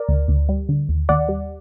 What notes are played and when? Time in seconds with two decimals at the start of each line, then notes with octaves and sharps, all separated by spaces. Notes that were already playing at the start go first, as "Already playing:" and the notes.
Already playing: A#4 D5
0.09 D2
0.28 D2
0.49 G3
0.69 D3
0.89 D#2
1.09 D#2 D5 F#5
1.28 G3